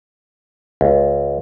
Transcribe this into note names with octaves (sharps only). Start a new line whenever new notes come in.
C#2